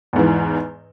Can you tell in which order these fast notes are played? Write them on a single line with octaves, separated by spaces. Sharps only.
E2 G#2 E3